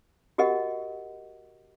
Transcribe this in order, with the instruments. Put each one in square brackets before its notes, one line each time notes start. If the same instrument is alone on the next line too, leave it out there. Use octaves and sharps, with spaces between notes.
[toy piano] F#4 G4 A#4 D#5 F#5